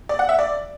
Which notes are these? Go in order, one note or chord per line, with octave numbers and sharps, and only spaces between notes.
D5
F#5
E5
D5